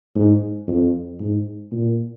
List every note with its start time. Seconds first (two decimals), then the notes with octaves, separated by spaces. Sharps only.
0.15 G#2
0.68 F2
1.20 G#2
1.72 A#2